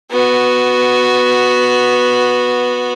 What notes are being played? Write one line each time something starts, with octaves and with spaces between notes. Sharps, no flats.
B3 F#4